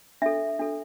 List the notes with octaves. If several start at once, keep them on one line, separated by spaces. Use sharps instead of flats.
D4 A4 E5
D4 A4